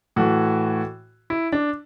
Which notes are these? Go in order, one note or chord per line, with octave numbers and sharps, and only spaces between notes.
A2 E3 F#4
E4
D4